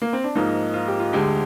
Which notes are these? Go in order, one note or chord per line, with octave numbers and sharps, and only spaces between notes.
A#3
C4
D4
G#2 F3 A#3 D#4
F4
G4
F4
D2 D3 G#3 G4